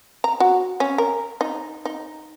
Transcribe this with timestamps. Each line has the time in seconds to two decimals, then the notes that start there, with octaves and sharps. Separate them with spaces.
0.24 A#5
0.40 F#4
0.80 C#4
0.98 A#4
1.41 D#4
1.85 D#4